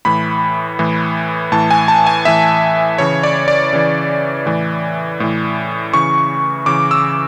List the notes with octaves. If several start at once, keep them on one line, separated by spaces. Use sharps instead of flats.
A2 E3 B5
A2 E3
A2 E3 A5
G#5
A5
G#5
A2 E3 E5
C#3 E3 C#5
D5
D5
C#3 E3
A2 E3
A2 E3
C#3 E3 C#6
C#3 E3 D6
E6